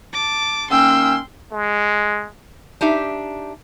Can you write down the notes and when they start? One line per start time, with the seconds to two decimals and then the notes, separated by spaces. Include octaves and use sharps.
0.13 A5 D6
0.70 D#3 A#3 C#4 G5 C6 E6
1.52 G#3
2.81 D4 D#4 G4 E5